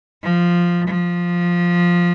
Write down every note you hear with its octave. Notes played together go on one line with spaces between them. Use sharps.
F3
F3